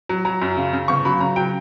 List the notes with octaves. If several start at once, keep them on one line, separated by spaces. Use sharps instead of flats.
F#3
F#3 A#5
F#2
C#3
C#3
G1 C#6
F#3 B5
C#3 A#5
F#3 G5